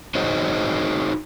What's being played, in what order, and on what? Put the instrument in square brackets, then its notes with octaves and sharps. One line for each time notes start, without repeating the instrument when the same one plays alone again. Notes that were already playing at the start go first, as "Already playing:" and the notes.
[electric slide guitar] D#4 F#4 G#4 C5 C#5 D#5